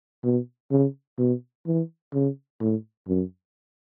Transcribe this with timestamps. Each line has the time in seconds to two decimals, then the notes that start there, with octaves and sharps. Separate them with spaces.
0.24 B2
0.71 C#3
1.18 B2
1.66 E3
2.14 C#3
2.61 A2
3.08 F#2